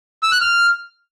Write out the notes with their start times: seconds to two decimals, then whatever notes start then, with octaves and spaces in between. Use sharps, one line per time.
0.23 E6
0.32 F#6
0.41 F6